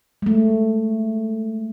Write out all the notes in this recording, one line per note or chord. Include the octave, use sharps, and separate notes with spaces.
G#3 A3